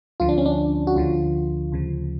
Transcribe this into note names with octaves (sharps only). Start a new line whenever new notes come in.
D2 D3 F3 F4
D4
C#4
D4
F#4
D2 D3 F3 F4
D2 C#3 F3